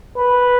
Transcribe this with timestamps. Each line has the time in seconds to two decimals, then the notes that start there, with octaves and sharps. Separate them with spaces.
0.18 B4